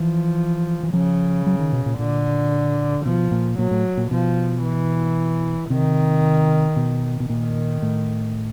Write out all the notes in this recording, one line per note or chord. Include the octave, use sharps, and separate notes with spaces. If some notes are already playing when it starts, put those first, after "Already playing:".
Already playing: E3 F3
E3
C#3 F3
F#3
D#3
B2
A#2
A#2 D3
B2 F3
A#2
A#2 F#3
A2
A#2
B2 F3
E3
C3 D#3
B2
B2
A#2 D#3
A2